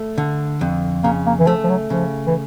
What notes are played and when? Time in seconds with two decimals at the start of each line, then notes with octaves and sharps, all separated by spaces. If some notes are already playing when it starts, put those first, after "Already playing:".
Already playing: A3
0.18 D3
0.61 F2
1.04 C#3 A#3
1.26 A#3
1.39 E3
1.47 F3 A3
1.64 F3
1.69 F#3
1.90 C#3 F3
2.27 E3